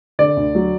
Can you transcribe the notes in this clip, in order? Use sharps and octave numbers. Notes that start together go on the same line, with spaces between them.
D3 D5
D2
F#3